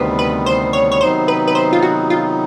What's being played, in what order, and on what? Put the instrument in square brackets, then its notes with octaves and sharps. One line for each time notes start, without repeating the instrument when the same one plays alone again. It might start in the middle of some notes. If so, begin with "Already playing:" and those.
Already playing: [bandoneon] D2 C3 D#3 G3 B3 [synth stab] B4 C5
[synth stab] B4
C5
C#5
C#5
[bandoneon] C3 D#3 F#3 B3 D#4 [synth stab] C5
[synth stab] B4
B4
C5
F4
F#4
F4